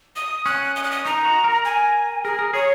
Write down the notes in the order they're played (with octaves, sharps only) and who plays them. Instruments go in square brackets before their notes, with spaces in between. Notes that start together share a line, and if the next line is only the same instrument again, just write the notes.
[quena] D#6
[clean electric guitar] C#4 [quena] F#6
[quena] D#6
F#6
D#6
[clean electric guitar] D#4 [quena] A#5
[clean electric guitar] F#4
A#4
[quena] G#5
[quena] G#4 [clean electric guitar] A#4
[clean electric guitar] A#4
[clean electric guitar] G#4 [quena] C#5